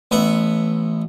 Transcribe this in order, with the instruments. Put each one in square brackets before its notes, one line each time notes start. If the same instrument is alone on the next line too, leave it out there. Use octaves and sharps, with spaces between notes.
[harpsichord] A1 B3 E5 F#5